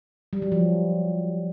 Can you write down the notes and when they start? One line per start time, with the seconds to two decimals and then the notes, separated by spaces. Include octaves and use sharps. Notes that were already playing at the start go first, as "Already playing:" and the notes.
0.33 G3
0.42 F#3
0.52 F3